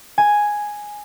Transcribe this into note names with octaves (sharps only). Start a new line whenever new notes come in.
G#5